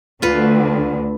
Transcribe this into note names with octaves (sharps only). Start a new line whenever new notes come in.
D2 D3 F4 B4